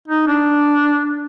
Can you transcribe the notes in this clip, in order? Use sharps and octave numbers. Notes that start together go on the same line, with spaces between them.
D#4
D4